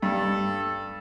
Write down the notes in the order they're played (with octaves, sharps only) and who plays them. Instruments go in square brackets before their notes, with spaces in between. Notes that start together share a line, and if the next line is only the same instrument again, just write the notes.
[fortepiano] G2 [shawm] A4